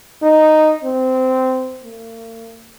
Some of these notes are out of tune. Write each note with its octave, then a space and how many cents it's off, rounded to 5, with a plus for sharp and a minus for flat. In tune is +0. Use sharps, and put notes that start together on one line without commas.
D#4 -5
C4 -15
A#3 -45